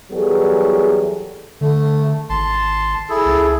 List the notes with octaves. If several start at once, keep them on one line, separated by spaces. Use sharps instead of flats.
E2 F#3 G3 B3 G#4 A4
D3 A3
G#1 A5 C6
E4 G#4 A4
C#2